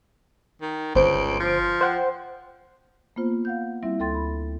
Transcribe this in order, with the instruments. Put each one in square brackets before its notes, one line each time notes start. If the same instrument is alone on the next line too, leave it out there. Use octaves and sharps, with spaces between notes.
[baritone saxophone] D#3
[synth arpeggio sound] G1 C5 D7 [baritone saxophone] C#2
[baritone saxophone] F3
[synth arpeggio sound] C5 F#5 G5
[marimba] A#3 B3 F4 C5
F5 F#5 G6
G3 C4 E4 E5
D2 A4 G5 C6 A6
B5